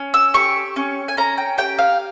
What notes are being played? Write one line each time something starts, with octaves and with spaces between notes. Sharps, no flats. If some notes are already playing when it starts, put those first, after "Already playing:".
Already playing: C#4
E6
G4 C#6
C#4
G#5
C#4 A#5
G5
G4 G5
F5